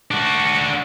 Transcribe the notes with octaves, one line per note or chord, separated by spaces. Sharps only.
D4 F#4